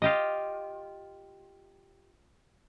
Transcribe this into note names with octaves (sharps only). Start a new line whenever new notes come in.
F4 G4 D#5